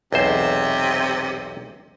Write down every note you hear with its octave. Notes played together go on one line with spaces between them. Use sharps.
B1 E2 C3 C5